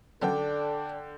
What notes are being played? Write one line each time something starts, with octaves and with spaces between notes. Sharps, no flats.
F#2 D3 F#3 B3 D4 A4 G5